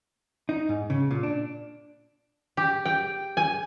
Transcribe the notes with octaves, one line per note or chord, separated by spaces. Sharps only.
D#4
G#2
C#3
A#2
D4
G4
G5
G#5